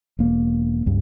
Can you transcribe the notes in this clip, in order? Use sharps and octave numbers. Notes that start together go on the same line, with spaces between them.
E1 A#3
C#2 G2